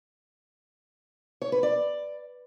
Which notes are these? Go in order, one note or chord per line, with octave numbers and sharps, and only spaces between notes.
C#5
B4
D5